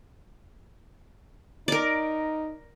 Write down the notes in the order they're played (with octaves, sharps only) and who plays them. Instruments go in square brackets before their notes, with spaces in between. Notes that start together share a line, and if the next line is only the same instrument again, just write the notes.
[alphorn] D#4 [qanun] A#4 D5